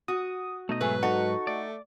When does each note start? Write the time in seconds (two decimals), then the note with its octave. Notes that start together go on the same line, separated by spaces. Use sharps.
0.08 F#4 D#6
0.69 B2 A3 D#4 D#5
0.81 G#2 F#3 A3 G#4 B4
1.03 D#4 F#4 A4 C#6
1.47 A3 D5